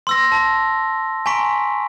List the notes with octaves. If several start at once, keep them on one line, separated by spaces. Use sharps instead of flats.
C6 E6 A#6
A5
G#5 A#5 C6 C#6 B6 D7